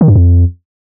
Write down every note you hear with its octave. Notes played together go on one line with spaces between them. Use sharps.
D#3
G2
F2